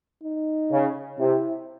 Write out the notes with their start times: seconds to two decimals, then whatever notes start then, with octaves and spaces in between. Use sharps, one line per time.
0.23 D#4
0.71 C#3
1.19 C3 E4